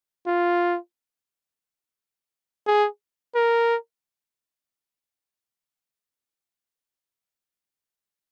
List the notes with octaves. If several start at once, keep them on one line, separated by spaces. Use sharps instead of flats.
F4
G#4
A#4